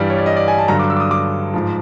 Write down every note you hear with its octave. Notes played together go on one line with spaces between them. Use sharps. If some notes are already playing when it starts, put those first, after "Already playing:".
Already playing: G2 E3 G3 D5
C#5
D5
D#5
D5
G#5
A5
G2 D3 F#3 A#5
D6
E6
D6
D#6
D6
G#2 F3